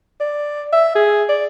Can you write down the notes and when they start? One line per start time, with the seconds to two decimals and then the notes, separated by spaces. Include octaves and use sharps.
0.20 D5
0.73 E5
0.96 G#4
1.29 D5